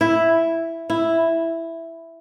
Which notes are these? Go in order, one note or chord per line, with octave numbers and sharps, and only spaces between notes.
E4
E4